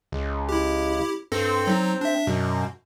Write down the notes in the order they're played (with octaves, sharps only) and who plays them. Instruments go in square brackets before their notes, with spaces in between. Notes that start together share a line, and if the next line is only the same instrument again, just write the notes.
[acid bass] C#2
[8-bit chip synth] E4 G4
[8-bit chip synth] G2 A4 A#6 [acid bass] C4
[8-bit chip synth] F#3 D#4
D4 E5
[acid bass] F#2 [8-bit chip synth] B2